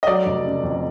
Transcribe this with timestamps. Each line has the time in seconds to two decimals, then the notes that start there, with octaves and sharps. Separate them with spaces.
0.03 D#5
0.07 F#3 D5
0.26 F1
0.44 C#3
0.63 F2